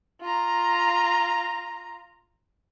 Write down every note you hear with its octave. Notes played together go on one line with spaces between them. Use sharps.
F4 A#5